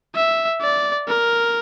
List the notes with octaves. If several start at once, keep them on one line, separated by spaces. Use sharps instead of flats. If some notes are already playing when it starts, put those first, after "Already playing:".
E5
D5
A#4